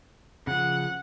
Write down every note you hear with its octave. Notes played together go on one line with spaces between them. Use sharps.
C#3 F3 F#5